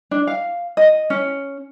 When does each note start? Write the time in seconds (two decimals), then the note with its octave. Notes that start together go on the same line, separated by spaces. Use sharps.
0.11 D4
0.27 F5
0.77 D#5
1.10 C#4